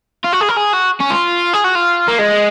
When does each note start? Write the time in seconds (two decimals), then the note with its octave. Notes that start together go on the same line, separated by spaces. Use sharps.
0.24 F4
0.33 F#4
0.40 G#4
0.49 A#4
0.56 G#4
0.73 F#4
1.00 C#4
1.10 F4
1.54 G#4
1.64 F#4
1.75 F4
2.08 A#3
2.19 G#3